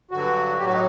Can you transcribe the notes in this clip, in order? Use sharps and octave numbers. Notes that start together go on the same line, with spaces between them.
G2 D3 F#3 F#4
A2 F#3 G4
F#4
D#4